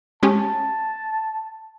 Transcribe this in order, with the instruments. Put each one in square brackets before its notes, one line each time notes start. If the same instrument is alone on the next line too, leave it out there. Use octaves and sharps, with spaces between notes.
[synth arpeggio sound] G#3 C#4 G4 [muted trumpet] A5